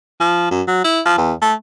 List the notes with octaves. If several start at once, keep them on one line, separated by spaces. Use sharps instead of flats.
F3
F#2
F#3
E4
F3
E2
A3